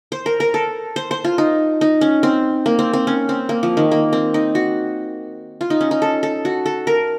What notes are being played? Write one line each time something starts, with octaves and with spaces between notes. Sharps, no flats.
C5
A#4
A#4
A4
C5
C5
F4
D#4
D#4
C#4
C4
A#3
C4
C4
C#4
C4
A#3
F3
D#3
A#3
C4
D#4
F#4
F4
D#4
C#4
D#4
A4
A4
F#4
A4
A#4